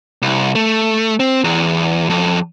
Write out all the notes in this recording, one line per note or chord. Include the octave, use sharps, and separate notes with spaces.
C2
A3
C4
E2
F2